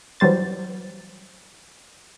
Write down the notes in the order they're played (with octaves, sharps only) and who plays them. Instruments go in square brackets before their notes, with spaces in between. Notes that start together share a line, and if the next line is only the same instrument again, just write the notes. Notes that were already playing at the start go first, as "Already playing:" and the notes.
[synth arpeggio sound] E3 F#3 G3 C5 A6